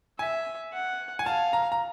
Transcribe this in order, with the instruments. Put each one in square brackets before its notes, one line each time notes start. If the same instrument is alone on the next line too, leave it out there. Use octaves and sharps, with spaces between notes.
[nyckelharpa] E5 [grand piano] G#5
[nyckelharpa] F#5
[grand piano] G#5
[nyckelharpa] F5 [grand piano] A5
[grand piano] A#5
A#5